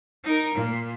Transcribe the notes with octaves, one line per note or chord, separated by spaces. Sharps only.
D#4 A#4
A#2